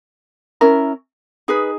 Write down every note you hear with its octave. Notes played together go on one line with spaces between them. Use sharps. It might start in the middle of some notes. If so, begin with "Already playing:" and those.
C#4 E4 A#4
D#4 G#4 B4